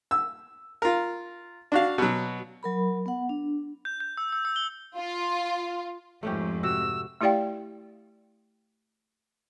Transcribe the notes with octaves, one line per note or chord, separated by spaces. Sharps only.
E6
F4 A#4
D4 F#4 F5
B2 F#3
F#3 A#4 B5
B3 F#5
D4
G6
G6
E6
E6
E6
G7
F4
F2 G#2 A3 C#4 G4
C3 F#4 E6
A3 E4 G4 D5 F5 G5